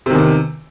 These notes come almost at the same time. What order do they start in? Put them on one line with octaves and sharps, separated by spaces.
C3 D#3 E2